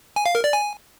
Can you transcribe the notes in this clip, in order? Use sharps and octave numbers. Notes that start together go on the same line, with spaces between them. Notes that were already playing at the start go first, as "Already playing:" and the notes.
G#5
F5
A#4
D5
G#5